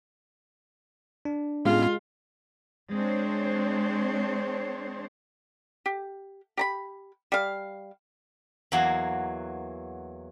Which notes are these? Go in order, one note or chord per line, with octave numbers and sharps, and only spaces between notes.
D4
A2 G#3 B3 C#4 F4 G4 F5
G#3 C4 D4 C5 C#5
G4
G4 A#5 B5
G3 F5
E2 E3 F#3 A#3 F#4